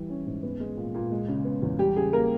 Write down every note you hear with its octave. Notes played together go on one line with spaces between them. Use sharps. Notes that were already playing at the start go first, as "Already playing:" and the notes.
Already playing: E3 G3
C#4
G#2
B3
G#3
A#2
A#2
G#3
C#3
B3
E2
G3 G4
C#3 G#4
A#3 A#4